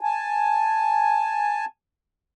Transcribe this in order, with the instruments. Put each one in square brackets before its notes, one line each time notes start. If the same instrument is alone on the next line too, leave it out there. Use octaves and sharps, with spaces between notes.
[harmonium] G#5 A5